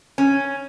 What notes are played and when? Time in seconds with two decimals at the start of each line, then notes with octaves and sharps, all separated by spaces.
0.18 C#4